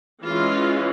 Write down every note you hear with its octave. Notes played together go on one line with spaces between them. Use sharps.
E3 G#3 C#4 F4